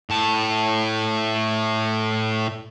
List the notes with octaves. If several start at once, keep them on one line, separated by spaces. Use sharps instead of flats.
A2 A5